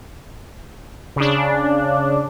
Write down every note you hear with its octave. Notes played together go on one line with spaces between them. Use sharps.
C#3 D4